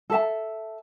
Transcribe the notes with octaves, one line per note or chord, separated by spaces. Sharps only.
A4 E5 A5